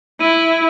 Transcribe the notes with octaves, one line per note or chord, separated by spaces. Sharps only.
E4 D#7